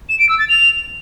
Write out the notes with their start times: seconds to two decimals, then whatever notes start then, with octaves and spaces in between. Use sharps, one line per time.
0.09 E7
0.19 D7
0.29 E6
0.39 A6
0.49 F7